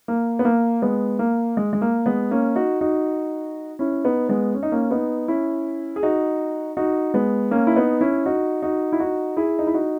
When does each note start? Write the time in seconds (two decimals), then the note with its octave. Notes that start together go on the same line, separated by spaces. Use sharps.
0.08 A#3
0.39 B3
0.45 A#3
0.82 G#3 B3
1.19 A#3
1.57 G#3
1.73 G#3
1.82 A#3
2.06 G#3 B3
2.31 A#3 C#4
2.55 D#4 F#4
2.81 D#4 F#4
3.79 C#4 E4
4.04 B3 D#4
4.29 G#3 B3
4.54 C#4
4.63 D#4
4.72 A#3 C#4
4.91 B3 D#4
5.28 C#4 E4
5.96 G#4
6.03 D#4 F#4
6.77 D#4 F#4
7.14 G#3 B3
7.51 A#3 C#4
7.67 E4
7.76 B3 D#4
8.01 C#4 E4
8.26 D#4 F#4
8.62 D#4 F#4
8.92 E4
9.00 D#4 F#4
9.37 E4 G#4
9.59 D#4
9.67 E4
9.74 D#4 F#4